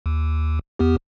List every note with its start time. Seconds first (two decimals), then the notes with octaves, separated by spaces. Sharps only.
0.06 D#2
0.79 E2 B3 G4